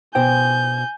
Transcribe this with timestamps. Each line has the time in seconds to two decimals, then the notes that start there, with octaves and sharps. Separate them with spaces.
0.15 B2 C5 G5 G#5 G6